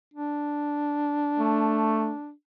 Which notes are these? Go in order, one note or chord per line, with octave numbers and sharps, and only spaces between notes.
D4
A3